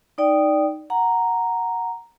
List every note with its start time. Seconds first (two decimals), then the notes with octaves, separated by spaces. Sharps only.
0.18 D#4 D5 G5 D#6
0.90 F#5 A#5